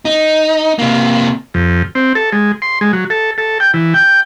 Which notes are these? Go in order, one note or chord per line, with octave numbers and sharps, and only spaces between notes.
D#4
C3 A#3
F2
C4
A4
G#3
C6
G#3
F#3
A4
A4
G5
E3
G5